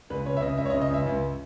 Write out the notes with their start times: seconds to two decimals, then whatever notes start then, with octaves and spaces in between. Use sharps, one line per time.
0.10 C#2 B4
0.26 C#3 C#5
0.37 E5
0.42 C#3 D#5
0.57 C#2 E5
0.65 C#5
0.70 D#5
0.74 C#3
0.82 D#5
0.90 C#2 E5
1.06 C#2